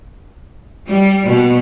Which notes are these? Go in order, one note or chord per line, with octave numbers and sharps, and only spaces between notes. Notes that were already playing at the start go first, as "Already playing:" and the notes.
G3
B2